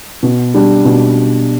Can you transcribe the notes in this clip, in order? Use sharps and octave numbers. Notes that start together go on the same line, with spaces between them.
B2
G3 D4 G4
B2